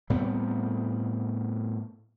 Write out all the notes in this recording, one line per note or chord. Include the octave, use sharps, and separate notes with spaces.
A2 G3 B3 C4